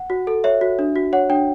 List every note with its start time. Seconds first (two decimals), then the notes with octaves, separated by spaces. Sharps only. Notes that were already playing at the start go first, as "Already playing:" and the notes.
Already playing: F#5
0.10 F#4
0.27 A4
0.44 C#5 E5
0.61 F#4
0.79 D4
0.96 F#4
1.13 C#5 F#5
1.30 D4 G5